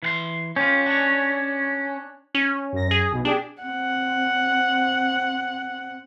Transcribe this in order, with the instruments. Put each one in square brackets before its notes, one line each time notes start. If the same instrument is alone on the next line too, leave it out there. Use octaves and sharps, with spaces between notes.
[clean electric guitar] E3 F#5 C6
[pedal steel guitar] C#4 [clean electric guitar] F4 G4
[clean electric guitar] D4 C#5
[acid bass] C#4
[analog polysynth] F#2 A#6
[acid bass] G#4
[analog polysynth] B1 B2
[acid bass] D4 [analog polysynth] G4 G#4 D5
[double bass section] C4 [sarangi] F#5